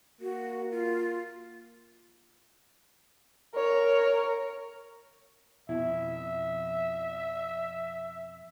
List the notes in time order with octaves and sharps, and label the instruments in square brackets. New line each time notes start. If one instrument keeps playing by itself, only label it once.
[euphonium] A#3 [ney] F#4
[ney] F4
[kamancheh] A#4 C#5
[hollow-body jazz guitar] F2 B2 E4 [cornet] E5